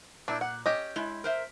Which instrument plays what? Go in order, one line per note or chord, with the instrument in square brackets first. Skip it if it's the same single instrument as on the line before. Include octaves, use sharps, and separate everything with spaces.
[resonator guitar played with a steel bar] A#2 [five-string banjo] D4 E4
[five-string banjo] F#5
C#4 G4 D#5
[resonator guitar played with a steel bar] G#3 E4
A#4 C5 E5